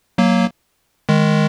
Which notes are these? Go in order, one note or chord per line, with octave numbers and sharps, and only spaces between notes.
F#3 A#3
D#3 G#3